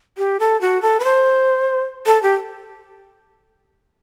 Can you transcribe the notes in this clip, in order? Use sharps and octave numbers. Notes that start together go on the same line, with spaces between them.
G4
A4
F#4
A4
B4
C5
A4
G4